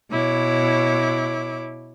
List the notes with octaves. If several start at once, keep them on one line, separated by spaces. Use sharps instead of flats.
B2 E4 C#5 D6